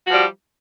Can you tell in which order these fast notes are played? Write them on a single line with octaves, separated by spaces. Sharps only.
F#4 F3 G3